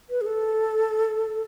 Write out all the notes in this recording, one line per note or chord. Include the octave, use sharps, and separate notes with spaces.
B4
G#4
A4